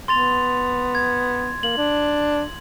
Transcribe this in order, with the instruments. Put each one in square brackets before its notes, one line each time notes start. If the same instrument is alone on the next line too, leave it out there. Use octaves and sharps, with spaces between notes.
[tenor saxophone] B3 [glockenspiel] C6 A6 F7
[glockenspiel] G#6
[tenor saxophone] A#3 [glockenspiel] F#7
[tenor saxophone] D4